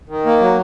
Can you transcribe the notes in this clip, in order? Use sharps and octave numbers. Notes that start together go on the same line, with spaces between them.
D#3
A#3
F#3